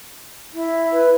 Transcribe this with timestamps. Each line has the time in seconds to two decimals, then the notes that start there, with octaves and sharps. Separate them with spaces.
0.54 E4
0.93 B4